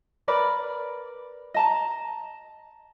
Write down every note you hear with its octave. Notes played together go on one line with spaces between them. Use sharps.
A#4 B4 D5 B5
D#5 A5 A#5